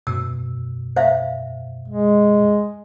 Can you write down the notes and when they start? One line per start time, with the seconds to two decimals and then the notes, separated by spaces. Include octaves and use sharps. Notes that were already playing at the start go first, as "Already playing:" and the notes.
0.07 F#2 B2 E6
0.96 C5 E5 F5
1.88 G#3